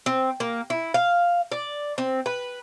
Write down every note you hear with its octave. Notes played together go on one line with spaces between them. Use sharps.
C4
A#3
E4
F5
D5
C4
B4